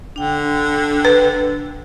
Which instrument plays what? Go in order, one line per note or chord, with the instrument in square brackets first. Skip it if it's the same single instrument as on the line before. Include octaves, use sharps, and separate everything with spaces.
[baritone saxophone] D3 [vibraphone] D4 G5
[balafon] B4